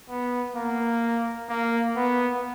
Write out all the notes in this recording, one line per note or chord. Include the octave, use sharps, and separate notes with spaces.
B3
A#3
A#3
B3